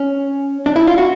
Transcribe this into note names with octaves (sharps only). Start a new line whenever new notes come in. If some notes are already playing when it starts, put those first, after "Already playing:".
Already playing: C#4
D4
E4
F4
F#4